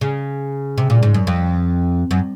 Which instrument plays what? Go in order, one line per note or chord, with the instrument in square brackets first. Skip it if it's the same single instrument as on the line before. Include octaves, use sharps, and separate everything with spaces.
[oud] C#3
C3
A#2
G#2
F#2
F2
F#2